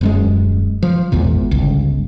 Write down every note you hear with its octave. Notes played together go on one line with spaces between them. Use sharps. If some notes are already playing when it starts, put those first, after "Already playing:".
D#1 F#2 G#3
F3
G#1 E2 A#2
G1 C#2